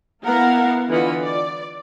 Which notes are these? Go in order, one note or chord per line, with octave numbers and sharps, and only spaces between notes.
A#3 B3 E4 A#4 F5 F#5
D3 E3 F4 D#5 F#5 B5
D5